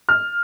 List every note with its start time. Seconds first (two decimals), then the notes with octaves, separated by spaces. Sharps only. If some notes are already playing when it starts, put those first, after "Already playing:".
0.09 F6